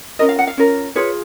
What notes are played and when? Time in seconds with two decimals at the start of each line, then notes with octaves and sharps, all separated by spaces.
0.19 C#4 F4 A#4 D#5
0.29 F5
0.39 F#5
0.47 F5
0.57 C#4 F4 A#4
0.95 F4 G#4 B4 C#5